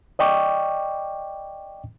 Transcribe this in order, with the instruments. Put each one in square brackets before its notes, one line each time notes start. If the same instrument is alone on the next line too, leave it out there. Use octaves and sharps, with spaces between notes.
[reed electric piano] D5 D#5 G5 C#6 D6